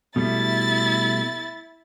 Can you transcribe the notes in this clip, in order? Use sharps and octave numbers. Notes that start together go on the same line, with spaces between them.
B2 G3 A3 E4 A6